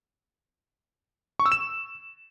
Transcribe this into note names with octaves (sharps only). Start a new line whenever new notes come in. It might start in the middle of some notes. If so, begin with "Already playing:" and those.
C#6
E6
E7